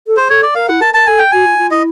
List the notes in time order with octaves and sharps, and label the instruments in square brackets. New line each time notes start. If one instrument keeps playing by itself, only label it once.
[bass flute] A4
[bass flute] G#4 [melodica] C5
[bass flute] A4 [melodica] C#5
[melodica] D5
[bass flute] A#4 [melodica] F5
[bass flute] E4 [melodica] F#5
[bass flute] A#4 [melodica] A5
[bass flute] A#4 [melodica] A5
[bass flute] A4 [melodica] G#5
[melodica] G5
[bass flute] F#4 [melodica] G#5
[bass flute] F4
F4
[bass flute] E4 [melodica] D#5